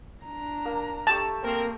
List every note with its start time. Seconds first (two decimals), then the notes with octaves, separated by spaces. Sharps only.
0.24 D4 A#5
0.65 A#3
1.07 A3 G4 A5 C#6
1.42 A#3 C4 A#4